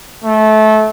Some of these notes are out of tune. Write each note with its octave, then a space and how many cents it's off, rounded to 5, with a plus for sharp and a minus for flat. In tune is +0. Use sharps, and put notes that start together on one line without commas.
A3 -25